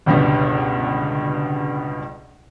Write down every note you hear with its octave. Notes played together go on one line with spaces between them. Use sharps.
G1 C#2 G2 B2 G3